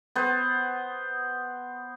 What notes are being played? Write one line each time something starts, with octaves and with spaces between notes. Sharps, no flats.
B3 C5